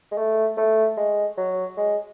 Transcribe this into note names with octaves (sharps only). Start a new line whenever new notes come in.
G#3
A3
A3
G#3
F#3
G#3